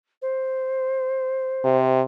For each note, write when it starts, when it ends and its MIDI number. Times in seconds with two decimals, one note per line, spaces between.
0.22 1.85 72
1.64 2.01 48